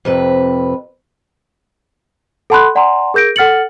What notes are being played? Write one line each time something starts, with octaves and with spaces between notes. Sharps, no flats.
F2 C3 B4
A4 F#5 A5 B5 C6 F#6
D5 F#5 G#5 A#5 C6
G#4 A#4 G6 A#6 D7
A4 F#5 F6 A6 C#7 F#7